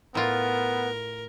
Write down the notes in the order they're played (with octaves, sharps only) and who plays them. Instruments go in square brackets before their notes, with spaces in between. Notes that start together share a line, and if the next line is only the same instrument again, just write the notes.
[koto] A2 F4 [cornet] B3 [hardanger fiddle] A#4